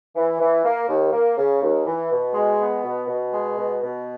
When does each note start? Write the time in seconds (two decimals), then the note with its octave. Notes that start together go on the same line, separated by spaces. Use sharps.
0.16 E3
0.40 E3
0.64 A#3
0.89 D#2
1.13 A#3
1.37 C#3
1.62 D#2
1.86 E3
2.10 B2
2.34 G#3
2.60 B3
2.84 B2
3.07 B2
3.32 G#3
3.57 B2
3.81 B2